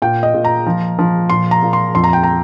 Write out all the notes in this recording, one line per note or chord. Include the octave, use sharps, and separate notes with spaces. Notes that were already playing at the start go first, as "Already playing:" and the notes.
A#2 G5
D#5
A#2
A#5
F3
F3
A#2 C6
A#5
A#2
C6
F2 C6
A#5
G5
A#5